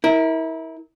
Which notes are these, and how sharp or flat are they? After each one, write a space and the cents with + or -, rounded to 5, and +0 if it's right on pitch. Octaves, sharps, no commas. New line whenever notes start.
E4 -30 A#4 +0